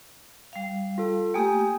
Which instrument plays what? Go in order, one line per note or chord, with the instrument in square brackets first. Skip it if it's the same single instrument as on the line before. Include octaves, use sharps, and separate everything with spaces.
[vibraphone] G3 F5
[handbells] F4 A4
[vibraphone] A3 A#3 G4 [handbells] G5 G#5 D#6